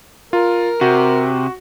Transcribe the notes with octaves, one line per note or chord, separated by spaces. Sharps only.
F4 A#4
C3 F#4